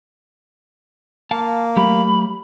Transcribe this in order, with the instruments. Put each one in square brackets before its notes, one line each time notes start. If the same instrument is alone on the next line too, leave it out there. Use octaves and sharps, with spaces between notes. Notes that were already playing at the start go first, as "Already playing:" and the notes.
[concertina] A#3 [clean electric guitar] F5 A5
[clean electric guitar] F#3 A3 G4 [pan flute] B5